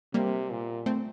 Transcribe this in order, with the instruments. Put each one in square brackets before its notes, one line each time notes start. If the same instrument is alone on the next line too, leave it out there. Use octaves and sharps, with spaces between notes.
[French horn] C3 [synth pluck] G3 A#3
[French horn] A#2
[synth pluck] A3 C4